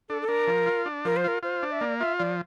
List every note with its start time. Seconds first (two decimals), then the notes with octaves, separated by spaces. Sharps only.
0.09 D4 A4
0.22 A4
0.28 D4 A#4
0.47 F3
0.66 F4
0.86 D4
1.05 F3 A#4
1.17 C5
1.24 F4 A#4
1.43 F4 C5
1.63 D4
1.72 E5
1.81 A#3 D5
2.00 F4 E5
2.19 F3 D5